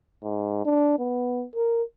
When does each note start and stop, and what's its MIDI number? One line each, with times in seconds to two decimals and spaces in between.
0.23 0.65 44
0.65 0.99 62
0.99 1.45 59
1.55 1.83 70